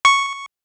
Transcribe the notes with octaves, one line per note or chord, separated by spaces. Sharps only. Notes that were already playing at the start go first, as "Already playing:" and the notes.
C#6